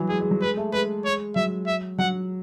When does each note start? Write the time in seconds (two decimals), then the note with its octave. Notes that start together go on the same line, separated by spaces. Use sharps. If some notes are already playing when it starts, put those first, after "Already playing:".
Already playing: E3 F#3
0.09 G#3 G#4
0.20 G#3
0.31 F#3
0.42 G#3 B4
0.57 A3
0.73 G#3 B4
1.05 C#5
1.36 F#3 E5
1.67 E5
1.98 F#3 F#5